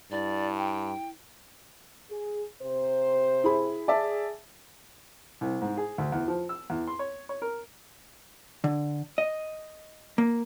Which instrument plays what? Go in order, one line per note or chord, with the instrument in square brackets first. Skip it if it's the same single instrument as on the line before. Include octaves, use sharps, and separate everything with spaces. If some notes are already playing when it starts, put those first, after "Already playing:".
[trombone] G2 [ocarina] E4 [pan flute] D5
[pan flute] G5
[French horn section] G#4
C3 C5
[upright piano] E4 G#4 B5
[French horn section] G#4 [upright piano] D5 E5 A5
[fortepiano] C2
G#2
G#4
D2
E2
F3
E6
E2
C6
C#5
C#5
A#4
[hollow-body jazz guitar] D3
D#5
A#3